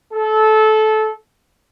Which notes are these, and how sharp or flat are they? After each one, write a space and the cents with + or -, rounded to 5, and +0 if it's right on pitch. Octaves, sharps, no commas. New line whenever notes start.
A4 -20